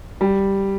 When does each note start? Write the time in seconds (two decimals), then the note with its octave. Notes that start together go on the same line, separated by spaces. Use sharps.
0.21 G3